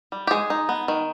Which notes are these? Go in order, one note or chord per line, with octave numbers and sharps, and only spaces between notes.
G3
G4
G#3 G#4
D#4
B3
D#3